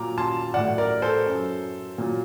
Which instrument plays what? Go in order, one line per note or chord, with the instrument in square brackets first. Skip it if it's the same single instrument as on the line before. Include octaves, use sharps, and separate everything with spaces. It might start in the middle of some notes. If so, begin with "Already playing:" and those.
Already playing: [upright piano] A#2 F#3 A#5 D6
A5 C6
A2 F#3 D5 F#5
A#4 D5
A4 C5
F#2 F#3
A#2 F#3